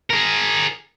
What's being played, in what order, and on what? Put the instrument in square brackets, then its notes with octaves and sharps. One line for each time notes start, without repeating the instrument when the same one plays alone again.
[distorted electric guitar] G#4 A#4